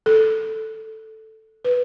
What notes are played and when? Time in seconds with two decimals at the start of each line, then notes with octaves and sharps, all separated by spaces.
0.06 A4
1.65 B4